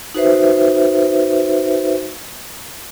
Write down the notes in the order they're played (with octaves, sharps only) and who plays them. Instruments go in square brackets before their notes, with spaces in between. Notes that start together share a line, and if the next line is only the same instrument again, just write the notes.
[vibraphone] D#4 F#4 B4 C5 E5